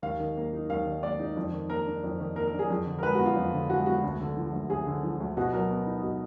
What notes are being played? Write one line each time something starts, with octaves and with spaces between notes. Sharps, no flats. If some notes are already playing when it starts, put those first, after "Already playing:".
D#2 F5
D#3
A#3
D#4
D#2 F5
D#3
A#3 D5
D#4
F2
D#3
A#3 A#4
D4
F2
D#3
A#3 A#4
A#4
D4
G#4
F2
D3
A#4
G#3 B4
F#4
B3
F4
F2
D3
G#3 F#4
B3 F#4
D2
D3
F3
D2
D2 G#4
D3
F3
D2
B2 F#4
F#3 A#4
B3
D#4
B2